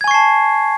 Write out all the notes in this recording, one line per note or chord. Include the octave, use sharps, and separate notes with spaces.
G#5 A5 C#6 G#6 C7